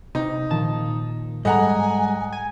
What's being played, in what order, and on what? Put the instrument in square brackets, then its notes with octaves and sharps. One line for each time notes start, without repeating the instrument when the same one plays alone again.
[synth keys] C3 [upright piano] D#4
[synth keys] A#2 D#3 F3 [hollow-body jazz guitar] A5
[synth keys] G#2 [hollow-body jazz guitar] G3 G#3 A4 [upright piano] D#5 F#5 A#5 [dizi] G#5
[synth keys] G#5